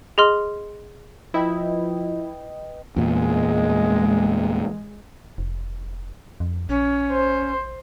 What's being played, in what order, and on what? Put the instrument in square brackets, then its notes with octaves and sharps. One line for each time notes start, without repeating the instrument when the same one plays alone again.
[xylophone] G#4 D#5 C6 F6
[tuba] F3 [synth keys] E4 [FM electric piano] B4 D#5 G5
[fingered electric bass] E2 A#2 [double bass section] G#3
[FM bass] F1
F2
[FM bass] A#1 [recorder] C#4
[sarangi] C5